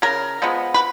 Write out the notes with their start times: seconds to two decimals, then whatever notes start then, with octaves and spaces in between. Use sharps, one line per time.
0.02 C#3 A#4
0.42 F3 G#3 B3
0.74 B4